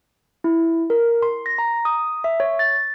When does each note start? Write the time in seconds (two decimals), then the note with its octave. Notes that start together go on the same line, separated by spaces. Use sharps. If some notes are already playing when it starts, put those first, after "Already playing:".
0.44 E4
0.90 A#4
1.22 C6
1.46 A#6
1.58 A#5
1.85 D#6
2.24 E5
2.40 C#5
2.59 A6